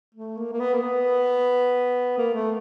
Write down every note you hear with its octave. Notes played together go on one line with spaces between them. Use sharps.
A3
A#3
A#3
B3
A#3
B3
A#3
A3